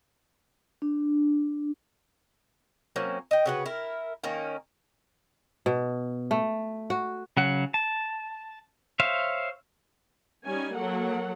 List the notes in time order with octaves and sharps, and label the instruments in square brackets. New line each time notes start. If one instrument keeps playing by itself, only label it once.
[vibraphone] D4
[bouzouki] F#3 A#3 C4 C#4
D#5 G5
C#3 F#4 B4
E4 A#4
D#3 A#3 C#4
[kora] B2
A3
F#4
[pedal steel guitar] C#3 F#3 F#5
A5
C5 C#5 E5 F5
[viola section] G3 C#4 D#4 G#5
F#3 A#3 A4 F#5